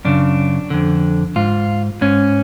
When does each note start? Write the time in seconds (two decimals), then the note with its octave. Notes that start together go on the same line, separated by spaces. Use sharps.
0.05 F#2 C#3 D4
0.70 F2 D3
1.36 G#2 F4
2.01 G#2 C#4